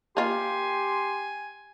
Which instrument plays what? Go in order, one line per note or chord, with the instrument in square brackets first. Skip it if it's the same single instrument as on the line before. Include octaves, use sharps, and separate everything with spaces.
[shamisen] A#3 F4 [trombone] G4 [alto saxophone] G#5 [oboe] C6